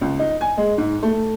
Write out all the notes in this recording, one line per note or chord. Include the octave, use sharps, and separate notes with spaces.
C#2
D#4
G#5
G#3
G#2
A3